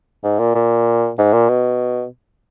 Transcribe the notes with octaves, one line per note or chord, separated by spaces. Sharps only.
G#2
A#2
A#2
G#2
A#2
B2